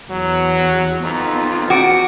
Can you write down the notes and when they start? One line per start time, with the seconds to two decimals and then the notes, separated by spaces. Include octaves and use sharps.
0.10 E2 F#3
1.03 F2 B3 D#4 F4
1.70 E2 F#4 G5 D6 D7